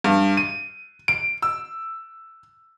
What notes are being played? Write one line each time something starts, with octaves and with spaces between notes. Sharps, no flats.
G2
D#7
D7
E6